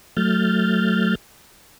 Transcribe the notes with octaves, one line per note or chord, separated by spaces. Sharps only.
F#3 A3 F6 G6 A6